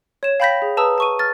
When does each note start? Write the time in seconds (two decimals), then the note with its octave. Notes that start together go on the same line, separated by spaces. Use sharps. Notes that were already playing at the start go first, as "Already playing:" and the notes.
0.23 C#5 E7
0.40 F5 G5 B5 G6 A#6 B6
0.62 G#4
0.77 B4 A5 A#5 D#6 E6
0.98 A5 C#6 D#7
1.19 F6 A6